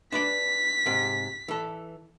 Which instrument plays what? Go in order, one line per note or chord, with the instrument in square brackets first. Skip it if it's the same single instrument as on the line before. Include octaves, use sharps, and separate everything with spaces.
[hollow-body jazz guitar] D4 B4 D5 [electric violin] B6
[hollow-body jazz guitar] G#2 C3
E3 A4